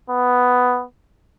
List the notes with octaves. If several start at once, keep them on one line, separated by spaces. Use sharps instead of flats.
B3